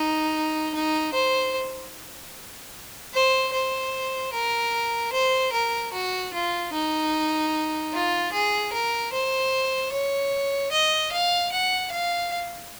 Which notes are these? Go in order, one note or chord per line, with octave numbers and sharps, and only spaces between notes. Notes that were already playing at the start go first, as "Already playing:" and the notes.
Already playing: D#4
D#4
C5
C5
C5
A#4
C5
A#4
F#4
F4
D#4
F4
G#4
A#4
C5
C#5
D#5
F5
F#5
F5